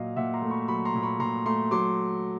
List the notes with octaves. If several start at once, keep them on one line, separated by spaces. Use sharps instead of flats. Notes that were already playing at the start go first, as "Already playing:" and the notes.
Already playing: A#2 F#3 D#5 F5
A#2 E5 F#5
A#5 C6
A3
B5 C#6
F#3 B5 C#6
A#5 C6
A#2
B5 C#6
A#2 A#5 C6
A3 A#5 C6
F#3 C6 D6